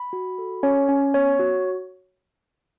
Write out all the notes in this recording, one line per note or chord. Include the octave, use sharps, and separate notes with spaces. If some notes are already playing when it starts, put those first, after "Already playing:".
Already playing: B5
F#4
A4
C#4 C#5
C#4
B3 C#5
F#4